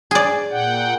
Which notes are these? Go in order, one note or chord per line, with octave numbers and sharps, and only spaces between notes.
G#4 D5
A#2 F#5 G5